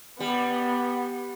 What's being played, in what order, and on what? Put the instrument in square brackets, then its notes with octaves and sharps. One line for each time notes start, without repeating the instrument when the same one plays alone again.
[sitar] G3 [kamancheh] B3